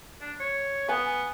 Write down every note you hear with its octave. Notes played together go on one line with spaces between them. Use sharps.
D4
C#5
B3 G#5 D#6